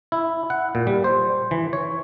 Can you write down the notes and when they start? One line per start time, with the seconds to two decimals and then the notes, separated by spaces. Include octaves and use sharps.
0.12 E4
0.50 F#5
0.75 A#2
0.87 G3
1.04 C5
1.51 E3
1.73 C#5